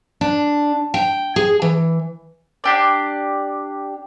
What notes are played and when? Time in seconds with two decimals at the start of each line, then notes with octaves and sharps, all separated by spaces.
0.21 D4
0.94 G5
1.36 G#4
1.62 E3
2.64 D4 G4 D5